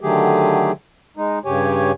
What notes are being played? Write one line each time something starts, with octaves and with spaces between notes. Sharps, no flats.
D3 D#3 F#3 A3 G4 G#4
G#3 D#4
G2 C#3 G4 C#5 G#5